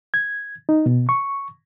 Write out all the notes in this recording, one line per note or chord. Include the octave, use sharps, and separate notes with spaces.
G#6
D#4
B2
C#6